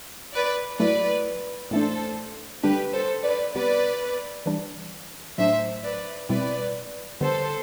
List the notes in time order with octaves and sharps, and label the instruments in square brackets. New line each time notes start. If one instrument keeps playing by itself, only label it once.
[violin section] B4 D5
[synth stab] A2 F#3 A3 E4 [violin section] B4 D5
[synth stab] A2 E3 A3 D4 [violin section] A4 C5
[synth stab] D3 G3 D4 [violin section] G4 B4
[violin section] A4 C5
B4 D5
[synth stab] C3 G3 B3 [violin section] B4 D5
[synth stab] E3 G3 D4
[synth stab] A2 F#3 A3 D4 [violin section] C5 E5
[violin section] B4 D5
[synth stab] B2 G3 C4 E4 [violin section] B4 D5
[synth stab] D3 G3 B3 [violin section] A4 C5